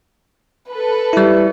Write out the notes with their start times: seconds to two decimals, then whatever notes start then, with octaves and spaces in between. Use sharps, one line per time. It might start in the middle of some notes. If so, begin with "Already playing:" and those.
0.69 A4 B4
1.13 G3 E4